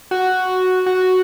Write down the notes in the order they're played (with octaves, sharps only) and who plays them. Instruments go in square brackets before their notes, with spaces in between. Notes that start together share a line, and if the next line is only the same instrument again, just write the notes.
[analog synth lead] F#4
F#4